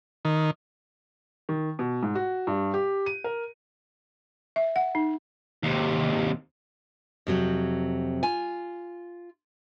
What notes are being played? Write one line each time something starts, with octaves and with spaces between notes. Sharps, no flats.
D#3
D#3
B2
G#2
F#4
G2
G4
D#7
A#4
E5
F#5
D#4
D#2 C3
F2 C3 F#3
F4 G#5